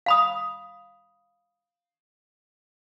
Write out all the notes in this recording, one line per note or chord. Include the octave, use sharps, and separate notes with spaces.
F5 B5 D#6